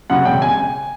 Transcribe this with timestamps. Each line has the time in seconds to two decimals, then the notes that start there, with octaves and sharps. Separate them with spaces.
0.10 F#2 C#3 F#5
0.25 E1 G5
0.42 G#5